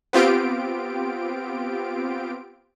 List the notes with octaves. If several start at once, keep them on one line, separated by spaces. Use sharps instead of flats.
B3 C4 F4 G4 D7